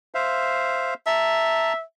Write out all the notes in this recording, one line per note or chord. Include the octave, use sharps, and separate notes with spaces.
C5 E5 F5
E5 A5 A#5